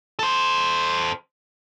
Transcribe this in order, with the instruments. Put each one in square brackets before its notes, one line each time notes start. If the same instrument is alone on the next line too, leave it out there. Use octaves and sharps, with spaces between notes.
[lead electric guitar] A4 C5